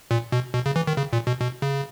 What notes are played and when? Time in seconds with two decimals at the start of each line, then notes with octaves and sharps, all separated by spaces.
0.11 A#2
0.32 B2
0.54 B2
0.66 C#3
0.76 E3
0.87 D#3
0.97 C#3
1.13 A#2
1.27 B2
1.41 B2
1.62 C#3